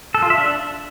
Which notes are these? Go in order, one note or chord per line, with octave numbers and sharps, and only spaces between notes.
A4
F4
E5
D4